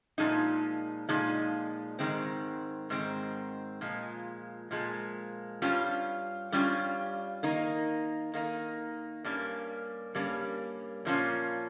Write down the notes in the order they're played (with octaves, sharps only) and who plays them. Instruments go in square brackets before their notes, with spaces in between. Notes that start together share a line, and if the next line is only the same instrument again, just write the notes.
[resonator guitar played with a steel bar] A#2 F3 G#3 D#4
A#2 F3 G#3 D#4
G#2 D#3 G#3 C4
G#2 D#3 G#3 C4
A#2 F3 G#3
A#2 F3 G#3
G2 G3 C#4 F4
G2 G3 C#4 F4
D#3 A#3 D#4
D#3 A#3 D#4
G2 G3 A#3 C#4
G2 G3 A#3 C#4
A#2 F3 A#3 C#4 F4